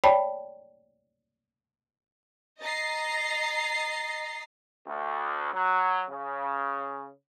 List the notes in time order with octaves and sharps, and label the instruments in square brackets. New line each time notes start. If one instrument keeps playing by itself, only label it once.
[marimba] C#5 D5 G5 A5 B5
[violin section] D#5 A#5 A6 C7
[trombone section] D2
F#3
C#3